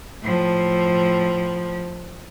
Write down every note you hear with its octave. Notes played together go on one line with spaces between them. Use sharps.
A2 F3